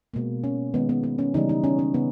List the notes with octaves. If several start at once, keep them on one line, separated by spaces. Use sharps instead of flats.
B2 G#3 A#3
C#4
D#3 G#3 B3
B3
B3
C#4
C#3 E3 G3 D#4
D#4
C#4
C#4
C#3 B3